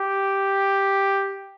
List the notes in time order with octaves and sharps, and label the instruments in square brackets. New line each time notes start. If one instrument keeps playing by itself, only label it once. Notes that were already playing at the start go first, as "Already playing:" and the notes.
Already playing: [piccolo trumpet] G4